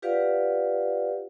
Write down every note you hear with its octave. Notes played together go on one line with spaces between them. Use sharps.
F4 G4 B4 D5 F5 F#5